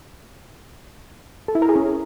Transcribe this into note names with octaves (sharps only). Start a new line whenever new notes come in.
A4
E4
A#4
G#4
C#4